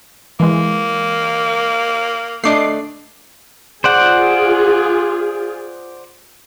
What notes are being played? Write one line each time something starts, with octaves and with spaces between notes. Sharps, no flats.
E3 G#3 A#3
A3 D4 D#5 D6 C7
F4 G#4 C5 D5 F#5